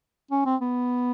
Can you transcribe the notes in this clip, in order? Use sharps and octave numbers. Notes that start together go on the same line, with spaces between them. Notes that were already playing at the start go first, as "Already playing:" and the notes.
C#4
C4
B3